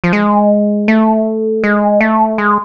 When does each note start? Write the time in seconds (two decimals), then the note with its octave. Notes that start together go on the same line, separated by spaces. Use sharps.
0.04 F3
0.13 G#3
0.88 A3
1.64 G#3
2.01 A3
2.38 G#3